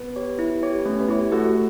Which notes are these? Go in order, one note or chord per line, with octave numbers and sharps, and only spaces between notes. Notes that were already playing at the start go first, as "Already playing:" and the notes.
Already playing: B3
G4 C#5
E4
G4 C#5
A3 C#4
B3
E4 G4 C#5
A3 F#4 A4